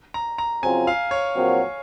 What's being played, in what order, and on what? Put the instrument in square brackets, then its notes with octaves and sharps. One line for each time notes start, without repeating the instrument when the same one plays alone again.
[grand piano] A#5
A#5
[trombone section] F2 C#3 F#3 C4 F4 [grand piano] G#5
[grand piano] F5
C#5
[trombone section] A#1 A#2 F#3 C4 F#4